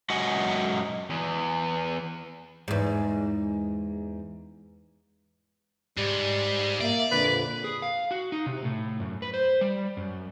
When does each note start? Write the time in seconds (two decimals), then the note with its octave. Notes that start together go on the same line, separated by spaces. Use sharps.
0.10 F#2 G#3 F#4 D#5 F#5 G#5
1.10 E2
2.68 E2 G#2
5.98 G#2 G3
6.81 A#3 D5 E5
7.11 F2 A#2 D3 B4
7.64 G#4
7.82 F5
8.11 F#4
8.32 D#4
8.46 C3
8.63 A2
9.00 F#2
9.22 B4
9.34 C5
9.61 G3
9.97 F#2